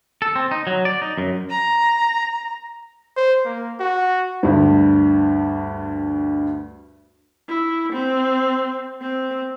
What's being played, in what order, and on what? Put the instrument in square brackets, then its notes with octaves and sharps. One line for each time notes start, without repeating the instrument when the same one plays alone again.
[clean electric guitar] A4
C4
D#4
F#3
D5
D#4
F#2
[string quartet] A#5
[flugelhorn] C5
A#3
F#4
[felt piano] D2 G2
[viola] E4
C4
C4